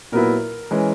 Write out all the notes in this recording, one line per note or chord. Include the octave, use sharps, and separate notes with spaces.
A#2 F#3 B3 E4 A#4
E3 G#3 C#4